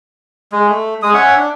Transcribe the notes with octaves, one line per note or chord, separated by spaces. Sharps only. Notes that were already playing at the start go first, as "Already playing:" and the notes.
G#3
A3
G#3 D#6
C#4 C#5 E5 F#5
D4